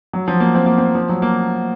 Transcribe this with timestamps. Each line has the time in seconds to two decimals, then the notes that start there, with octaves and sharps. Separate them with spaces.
0.13 F#3
0.28 F3
0.40 A#3
0.55 C4
0.66 A#3
0.78 C4
0.95 F3
1.09 F#3
1.22 A#3